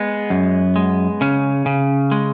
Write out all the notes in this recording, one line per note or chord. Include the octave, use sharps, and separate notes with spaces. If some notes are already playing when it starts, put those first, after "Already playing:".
Already playing: G#3 B3
F#2
G#3
C#3 C#4
C#3
G#3